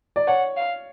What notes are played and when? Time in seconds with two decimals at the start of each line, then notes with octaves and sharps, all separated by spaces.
0.16 D5
0.27 C#5 F#5
0.56 F5